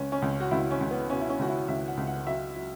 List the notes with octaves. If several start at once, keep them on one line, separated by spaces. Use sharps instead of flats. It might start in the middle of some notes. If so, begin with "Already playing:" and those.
Already playing: C#2 C#4
C#4
C#2
F#4
C#2 E4
C#4
C#2
B3
B2 C#4
E4
C#4
C#2 F#4
E4
C#2 E5
F#5
C#2
F#5
F#3 E5
F#3